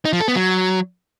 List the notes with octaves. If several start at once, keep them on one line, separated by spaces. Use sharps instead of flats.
D#4
F3
A4
B3
F#3